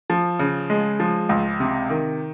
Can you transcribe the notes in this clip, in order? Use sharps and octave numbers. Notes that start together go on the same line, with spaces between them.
F3
C#3
G#3
F3
C#2
C3
D#3